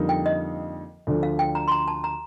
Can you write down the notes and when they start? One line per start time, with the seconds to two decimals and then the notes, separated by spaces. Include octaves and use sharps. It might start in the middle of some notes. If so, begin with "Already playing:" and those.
Already playing: F2 D3 G3 A#3 D#4
0.09 G5
0.26 D#5
1.07 D2 D3 F3
1.23 F5
1.39 G5
1.55 A#5
1.68 C6
1.72 A#5
1.88 A5
2.04 A#5